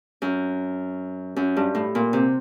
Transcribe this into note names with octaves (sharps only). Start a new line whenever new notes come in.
F#2
F#2
G2
A2
A#2
C3